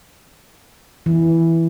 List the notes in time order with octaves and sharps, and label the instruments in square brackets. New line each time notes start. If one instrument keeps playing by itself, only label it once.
[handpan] E3